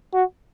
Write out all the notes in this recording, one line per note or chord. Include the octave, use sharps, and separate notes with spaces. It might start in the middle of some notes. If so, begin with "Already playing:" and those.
F#4